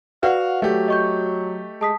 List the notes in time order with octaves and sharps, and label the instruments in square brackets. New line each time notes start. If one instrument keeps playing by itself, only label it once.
[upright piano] F#4 [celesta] B4 D5 F#5 [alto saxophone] F5
[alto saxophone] F#3 [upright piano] A3 G4
[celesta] D#5 C#6 G6
[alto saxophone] G#3 [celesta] A5 D#6 B6